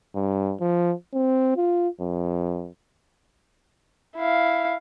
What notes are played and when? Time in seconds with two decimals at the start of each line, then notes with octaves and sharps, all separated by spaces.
0.15 G2
0.60 F3
1.13 C4
1.56 F4
2.00 F2
4.17 E4 F5